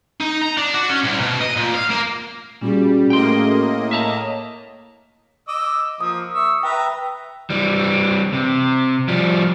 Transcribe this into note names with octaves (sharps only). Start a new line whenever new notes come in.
D#4
A#5
D4
F#4
C#4
C2
B2
D#5
A#2
F5
A#3
A#2 G3 C#4 F#4 G#4
A2 A#3 D#5 G5 C6
C#5 E5 A5 A#5
D#5 D6 E6
F3 A#3 D#6
E5 C#6 E6
B4 E5 G5 A#5
E3 G3
C3
F3 G3